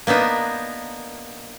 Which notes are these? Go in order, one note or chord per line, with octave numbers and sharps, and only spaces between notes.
A#3 B3 D4 D#4